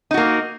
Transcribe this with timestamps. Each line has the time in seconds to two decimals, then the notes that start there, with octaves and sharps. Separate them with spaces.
0.11 D#4
0.14 F#4
0.17 A#3